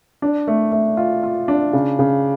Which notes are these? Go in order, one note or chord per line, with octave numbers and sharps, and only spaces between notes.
D4
A3
A3
F4
F4
D4
C#3
C#3